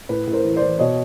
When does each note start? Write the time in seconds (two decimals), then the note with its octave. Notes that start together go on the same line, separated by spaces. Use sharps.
0.09 A2 B4
0.27 A2
0.32 A#4 C5
0.45 E3
0.56 C5 D5
0.62 E3
0.79 B2 C#5 D#5